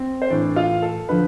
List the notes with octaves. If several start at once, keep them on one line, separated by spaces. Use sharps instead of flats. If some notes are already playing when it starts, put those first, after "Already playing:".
Already playing: C4
C5
A2 E3 D4 D5
F4 F5
A4
D3 F3 B4